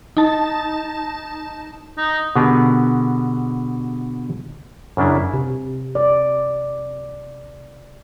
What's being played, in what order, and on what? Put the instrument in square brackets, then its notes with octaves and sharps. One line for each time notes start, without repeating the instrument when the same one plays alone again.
[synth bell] D#4 A5
[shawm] D#4
[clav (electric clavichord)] B2 D3 B3 G4 G#4 A#4
F#2 C#3 D4 E4
[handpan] C3
D5